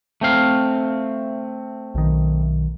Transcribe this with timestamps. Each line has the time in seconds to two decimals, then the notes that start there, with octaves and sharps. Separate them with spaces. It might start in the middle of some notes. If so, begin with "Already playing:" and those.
0.21 A3 C4 F5
1.95 B1 D#3